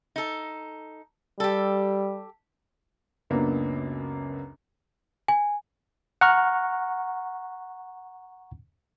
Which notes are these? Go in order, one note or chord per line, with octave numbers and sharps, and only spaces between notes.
D#4 A4
G3 G4 A4
C#2 F#2 A#3 B3 D4 A#5
G#5
F#5 A#5 C#6 F6